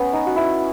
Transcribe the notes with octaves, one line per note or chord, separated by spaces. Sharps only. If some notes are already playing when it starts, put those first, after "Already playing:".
Already playing: B3 C#4
D#4
F#4
E4